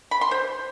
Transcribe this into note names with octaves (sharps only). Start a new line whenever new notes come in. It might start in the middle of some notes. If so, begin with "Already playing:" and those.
B5
C6
C5